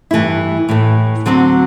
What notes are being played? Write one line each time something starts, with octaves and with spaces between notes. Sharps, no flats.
G2 E3 A3 E4
A2 E3 A3
D2 D3 F#3 C4 F#4